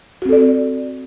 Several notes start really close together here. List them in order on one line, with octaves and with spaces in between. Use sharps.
F#4 C4 A4 D5